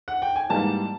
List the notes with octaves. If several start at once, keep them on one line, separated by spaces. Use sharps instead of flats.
F#5
G5
G#5
G#2 E3 G3 A#3 A5